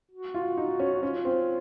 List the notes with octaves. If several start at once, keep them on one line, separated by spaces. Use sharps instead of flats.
F#4
F4
D#4
C#4
F#4
C#4 F4
C4